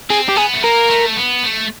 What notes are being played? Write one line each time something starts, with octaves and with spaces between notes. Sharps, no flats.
C4 G#4
G4
B3 G#4
A3
A#3 A#4
A3
B3
A3